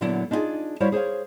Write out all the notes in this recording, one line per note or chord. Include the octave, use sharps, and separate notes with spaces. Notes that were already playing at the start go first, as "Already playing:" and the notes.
A#2 D3 F#3 B3 E4
D4 D#4 F4 F#4 G#4
G3 E4 F#4 C5 C#5 F5
G#4 C5 C#5 F5